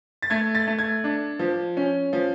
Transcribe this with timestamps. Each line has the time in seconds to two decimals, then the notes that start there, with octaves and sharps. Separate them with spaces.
0.22 A6
0.30 A3 G#6
0.55 A6
0.67 A3
0.79 G#6
1.04 D4
1.39 F3
1.77 C#4
2.13 F3